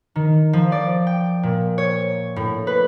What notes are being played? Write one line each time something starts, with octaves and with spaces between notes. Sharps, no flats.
D#3
F3
D5
G5
A#2
C#5
A2
B4